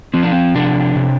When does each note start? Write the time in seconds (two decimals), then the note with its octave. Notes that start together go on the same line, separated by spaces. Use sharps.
0.14 F3 C4
0.23 D4
0.32 C4
0.55 C3 D4
0.96 C3